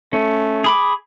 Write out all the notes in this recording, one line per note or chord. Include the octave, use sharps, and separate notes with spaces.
A3 C#4
G#4 B5 D6